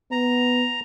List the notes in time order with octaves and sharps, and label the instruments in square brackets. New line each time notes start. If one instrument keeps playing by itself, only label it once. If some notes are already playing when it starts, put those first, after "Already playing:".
[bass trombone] B3 [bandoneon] A#5